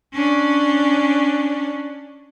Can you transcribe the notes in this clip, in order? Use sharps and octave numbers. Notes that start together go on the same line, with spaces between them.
C#4 D4